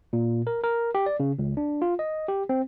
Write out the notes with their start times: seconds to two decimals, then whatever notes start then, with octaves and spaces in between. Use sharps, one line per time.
0.13 A#2
0.47 A#4
0.64 A#4
0.95 G4
1.06 D5
1.20 C#3
1.39 C#2
1.57 D4
1.82 F4
1.99 D#5
2.28 G4
2.49 C4